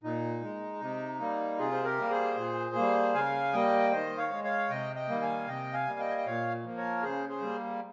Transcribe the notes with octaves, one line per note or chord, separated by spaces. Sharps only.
A#2 D#4
G#3
C3
G3 A#3
C3 F4 G#4
C5
G4 A#4
G3 A#3
G#4 C5
A#2
G3 A#3
C#3 F5 G#5
G3 A#3 D#5 G5
D#3 C5 D#5
C#5 F5
G#3
C#5 F5
C3 D#5 G5
D#5 G5
D#3 G3 A#3
F5 G#5
C3 D#5 G5
F5 G#5
G3 A#3
D#5 G5
G#5
G5
A#2 C#5 F5
F3 A#3
A#4 C#5
C#3 G#4 C5
G#4 C5
G3 A#3